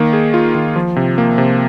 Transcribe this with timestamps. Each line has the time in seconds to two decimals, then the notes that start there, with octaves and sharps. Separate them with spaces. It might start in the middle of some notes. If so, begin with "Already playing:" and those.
Already playing: D#3 A#3
0.13 G#4
0.34 F4
0.55 D#3
0.76 F3
0.96 C3
1.18 A#3
1.38 C3